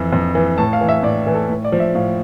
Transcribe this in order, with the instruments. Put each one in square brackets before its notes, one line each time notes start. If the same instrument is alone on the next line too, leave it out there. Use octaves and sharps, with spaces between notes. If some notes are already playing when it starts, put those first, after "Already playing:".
Already playing: [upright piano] F2 E3
F2
E3
A2 A5
F5
E3
E5
A2 D5
E3
A4
A2
D5
F3
E5
A2 F5